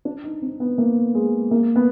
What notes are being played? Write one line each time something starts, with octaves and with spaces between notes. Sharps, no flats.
D4
D#4
C4
B3
A#3
G#3
A#3
B3